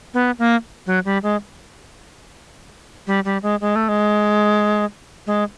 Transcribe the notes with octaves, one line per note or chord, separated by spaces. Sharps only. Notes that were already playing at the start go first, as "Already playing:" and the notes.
B3
A#3
F#3
G3
G#3
G3
G3
G#3
G#3
A3
G#3
G#3